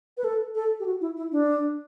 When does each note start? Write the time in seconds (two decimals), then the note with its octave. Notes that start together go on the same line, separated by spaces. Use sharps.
0.17 B4
0.24 A4
0.55 A4
0.80 G4
0.86 F#4
1.01 E4
1.17 E4
1.32 D4